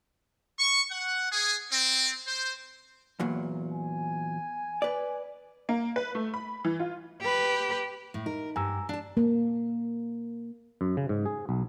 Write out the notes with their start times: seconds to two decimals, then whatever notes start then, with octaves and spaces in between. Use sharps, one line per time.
0.57 C#6
0.89 F#5
1.29 G#4
1.70 C4
2.26 C5
3.20 E2 A#2 F#3
3.72 G#5
4.82 B4 D5
5.69 A#3
5.96 B4
6.15 A3
6.34 B5
6.65 E3
6.80 F4
7.21 G4 B4
8.14 A2
8.26 D#4 A#4
8.56 G2 G#5 A#5 E6
8.89 D4 A5
9.17 A#3
10.81 F#2
10.97 C#3
11.09 G#2
11.26 G#4
11.49 B1